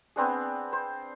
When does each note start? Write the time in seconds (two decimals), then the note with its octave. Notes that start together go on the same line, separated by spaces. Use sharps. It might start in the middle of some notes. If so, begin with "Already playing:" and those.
0.16 B3 C4 D4 G#4
0.73 C5